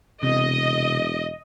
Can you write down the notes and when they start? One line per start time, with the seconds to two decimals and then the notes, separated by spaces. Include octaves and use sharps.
0.23 E1 C3 D#5